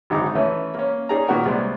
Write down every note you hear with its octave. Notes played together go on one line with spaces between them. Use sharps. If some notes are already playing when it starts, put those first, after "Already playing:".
G#1 F#2 D3 D#4 G#4 D6
E3 A3 C#4
A#3 C#4
C#4 D#4 G#4 D5 A#5
A#2 D#3 B3 F#4 A#4
C2 G#3 D5